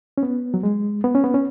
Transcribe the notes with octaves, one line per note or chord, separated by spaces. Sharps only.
C#4
B3
F#3
G#3
B3
C#4
B3
C#4